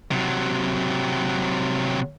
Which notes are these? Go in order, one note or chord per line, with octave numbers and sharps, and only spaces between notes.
C3 F#3